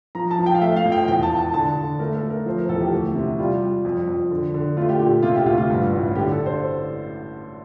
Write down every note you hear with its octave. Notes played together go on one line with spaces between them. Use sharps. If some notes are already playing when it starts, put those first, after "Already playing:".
F3 A#5
A5
F3
G5
F5
A3 E5
F5
F2
G5
E2 G5
A5
E3
A5
D3 A5
D3
A3 A#4
A4
A3
A#4
F3 C5
A#4
E2 A4
G4
D2
C3
G3 F4
G3
F2
F2
D3
D3
A3 F4
G4
A#2 G4
C3 F4
G4
D2 F4
F4
G2
A1
D3 G4
A4
D3
C5